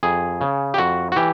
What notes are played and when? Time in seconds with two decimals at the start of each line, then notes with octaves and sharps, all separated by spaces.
0.03 F2 G#4
0.41 C#3
0.74 G4
0.78 F2 F#4
1.12 F#4
1.16 E3 G4